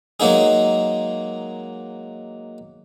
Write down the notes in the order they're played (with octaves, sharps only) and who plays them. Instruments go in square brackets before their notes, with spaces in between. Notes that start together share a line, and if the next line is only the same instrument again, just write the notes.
[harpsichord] F#3 G#3 A#3 D#4 G#4